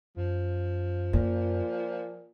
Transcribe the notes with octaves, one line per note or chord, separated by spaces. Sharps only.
F#2 F3
A#2 A#3